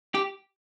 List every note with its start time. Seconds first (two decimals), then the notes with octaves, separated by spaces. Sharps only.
0.15 G4